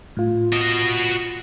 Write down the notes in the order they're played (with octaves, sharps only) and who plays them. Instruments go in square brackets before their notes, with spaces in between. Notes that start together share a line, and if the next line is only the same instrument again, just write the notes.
[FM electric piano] A2 F4
[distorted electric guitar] F#4 D#5